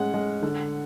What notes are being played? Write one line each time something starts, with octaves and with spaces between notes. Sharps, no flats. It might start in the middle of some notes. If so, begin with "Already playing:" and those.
Already playing: A2 G#3 C#4 F#5
G#3
D3